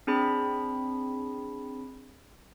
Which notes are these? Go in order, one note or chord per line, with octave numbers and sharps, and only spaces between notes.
C4 D4 G#4 B5